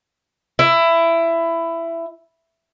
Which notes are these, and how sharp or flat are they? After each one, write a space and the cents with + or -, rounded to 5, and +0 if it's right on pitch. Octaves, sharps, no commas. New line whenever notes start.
E4 +15